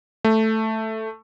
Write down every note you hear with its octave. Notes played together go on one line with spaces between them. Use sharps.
A3